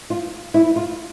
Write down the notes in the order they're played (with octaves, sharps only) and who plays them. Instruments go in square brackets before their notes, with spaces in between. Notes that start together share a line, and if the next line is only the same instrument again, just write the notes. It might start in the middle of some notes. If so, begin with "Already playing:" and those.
[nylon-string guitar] F4
E4
F4